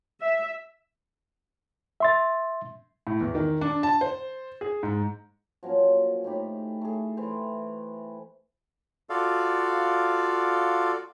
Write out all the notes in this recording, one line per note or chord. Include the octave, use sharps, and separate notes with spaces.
E5
E5 C6 A6
A2
E2
D#3
D4
A5
C5
G#4
G#2
F3 F#3 A#3 C#4
A2 D#4 G4 B5
A3 G#4
E3 B4 C5 G5
F4 F#4 A4 D5 F5